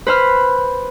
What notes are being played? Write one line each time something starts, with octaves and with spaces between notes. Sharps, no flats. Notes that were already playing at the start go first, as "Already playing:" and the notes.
B4 C5 B5 F6